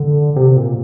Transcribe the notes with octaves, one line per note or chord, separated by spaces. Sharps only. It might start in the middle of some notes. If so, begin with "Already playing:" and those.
Already playing: D3
C3
A#2